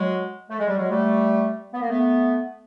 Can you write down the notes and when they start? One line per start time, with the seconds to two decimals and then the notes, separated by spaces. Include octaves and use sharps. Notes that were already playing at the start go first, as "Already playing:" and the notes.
Already playing: F#3 G#3
0.50 A3
0.59 G#3
0.69 G3
0.78 F#3 G#3
0.91 G3 A3
1.74 B3
1.81 A#3
1.89 A3 B3